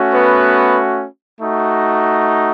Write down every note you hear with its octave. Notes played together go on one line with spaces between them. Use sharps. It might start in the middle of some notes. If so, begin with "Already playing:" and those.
Already playing: A3 C#4 F#4
B3 B4
A3 D#4 F#4